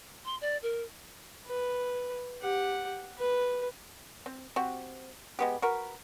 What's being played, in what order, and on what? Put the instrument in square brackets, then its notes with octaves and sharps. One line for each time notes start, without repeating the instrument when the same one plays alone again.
[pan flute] C6
D5
A#4
[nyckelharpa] B4
G4 F#5
B4
[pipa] C4
C4 F#4 G4
G#3 B3 G4
F#4 A#4 B4